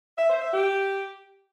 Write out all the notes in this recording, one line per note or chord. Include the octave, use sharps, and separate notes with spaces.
E5
C5
E5
G4